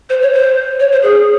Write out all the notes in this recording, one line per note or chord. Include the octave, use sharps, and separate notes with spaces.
C5
C#5
C5
C#5
C5
G#4